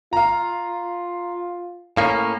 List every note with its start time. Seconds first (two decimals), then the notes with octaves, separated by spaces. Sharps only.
0.13 F4 F5 A#5
1.97 A2 A#3 C#4 F5